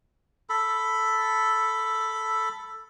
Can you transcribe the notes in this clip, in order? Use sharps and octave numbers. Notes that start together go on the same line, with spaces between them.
A4 B5